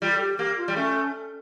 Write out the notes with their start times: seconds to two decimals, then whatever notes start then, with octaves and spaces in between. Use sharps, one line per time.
0.02 G3 F4
0.11 A4
0.20 G4
0.39 A#3 G4
0.57 F4
0.68 G3
0.76 A3 C#4